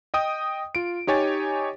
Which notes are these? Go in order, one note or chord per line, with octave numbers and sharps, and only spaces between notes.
D#5 G5 D#6
F4 D7
D#4 G4 C#5 G#5 A6